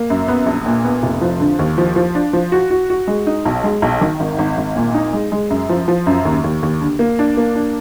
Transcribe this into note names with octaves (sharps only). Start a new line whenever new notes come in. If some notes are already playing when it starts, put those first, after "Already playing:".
Already playing: A#3
F#2
B3
A#1
A#2
B3
F1
F3
D3
D#2
F3
F3
D4
F3
F#4
F#4
F#4
G#3
D#4
B1
G#3
B1
D#3
G#1
G#1
G#1
A#2
D#4
G#3
G#3
F#2
F3
F3
F#2
D#2
D#2
D#2
D3
A#3
D4
A#3
D4